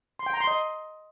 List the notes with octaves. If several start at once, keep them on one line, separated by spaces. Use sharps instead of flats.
C6
G5
A#5
C6
D#5